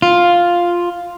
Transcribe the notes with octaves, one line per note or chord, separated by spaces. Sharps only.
F4